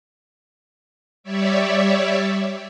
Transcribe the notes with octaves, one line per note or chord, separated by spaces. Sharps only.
G3 C#5 D5 E5